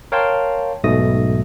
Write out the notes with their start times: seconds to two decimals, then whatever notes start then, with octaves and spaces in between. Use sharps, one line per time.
0.12 A#4 C#5 F5 G5 A5 C6
0.84 B1 G#2 B2 A3 D#6 A#6